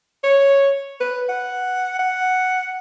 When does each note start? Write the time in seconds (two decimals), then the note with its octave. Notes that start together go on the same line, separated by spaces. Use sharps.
0.24 C#5
1.00 B4
1.29 F#5
2.00 F#5